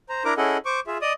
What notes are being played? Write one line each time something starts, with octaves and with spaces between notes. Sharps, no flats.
C5 A#5
D4 E4 A#4 A#5 D6
C#4 E4 G#4 A4 D#5 F#5
C5 C#6 D6
F4 G#4 E5
D5 D#5 D#6